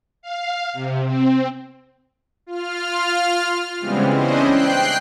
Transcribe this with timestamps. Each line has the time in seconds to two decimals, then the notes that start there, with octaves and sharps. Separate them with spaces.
0.22 F5
0.73 C3
1.04 C4
2.46 F4 F6
3.80 C#3 E3 G3 G#3 B3 C4
4.11 C#4 D4 E4 C5 D#5
4.42 G5 F#6 C7